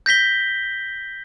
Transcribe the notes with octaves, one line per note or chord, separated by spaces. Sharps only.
G6 A#6 B6 G7